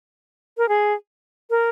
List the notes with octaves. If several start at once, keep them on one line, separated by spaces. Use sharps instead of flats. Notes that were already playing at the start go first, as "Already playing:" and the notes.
A#4
G#4
A#4